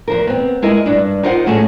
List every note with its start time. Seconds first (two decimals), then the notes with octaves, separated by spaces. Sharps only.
0.08 E2 F3 A#4
0.27 B3 C4
0.62 G#3 E4 A#4 D#5
0.86 G2 D4
1.23 D#4 F4 A#4 C5 F#5
1.46 A2 F#3 A3 C#4 G#4 A5